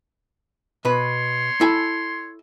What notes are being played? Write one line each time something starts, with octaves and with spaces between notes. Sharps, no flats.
B2 B4 C#5 C6
E4 A4 G#5